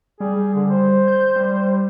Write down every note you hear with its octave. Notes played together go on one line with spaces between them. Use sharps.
G3 G#4
D3
C5
G6
G3